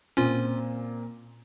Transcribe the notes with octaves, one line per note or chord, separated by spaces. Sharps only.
A#2 C4 C#4 F4